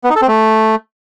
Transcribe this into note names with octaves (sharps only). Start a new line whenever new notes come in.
B3
D#4
A4
C4
A3